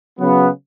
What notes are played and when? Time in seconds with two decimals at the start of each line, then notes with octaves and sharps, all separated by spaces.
0.20 C#3 F#3 B3